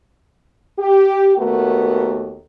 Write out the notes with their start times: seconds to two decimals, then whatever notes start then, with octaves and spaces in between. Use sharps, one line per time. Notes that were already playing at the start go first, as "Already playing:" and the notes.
0.79 G4
1.37 D#2 A3 B3 F#4 A#4